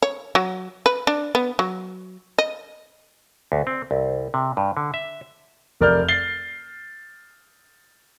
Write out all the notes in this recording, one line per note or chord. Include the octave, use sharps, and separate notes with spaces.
C#5
F#3
B4
D4
B3
F#3
D#5
D2
C4
C2
C3
G2
D3
E5
F1 A#4 D5 F6 G6
A6 C7 G7